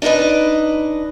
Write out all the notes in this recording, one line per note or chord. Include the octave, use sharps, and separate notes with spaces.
D4 D#4 F#4 B4 D#5